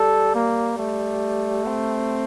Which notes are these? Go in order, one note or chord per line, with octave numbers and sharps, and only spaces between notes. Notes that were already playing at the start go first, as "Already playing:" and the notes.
Already playing: G3 A4
A#3
G3 A3
C4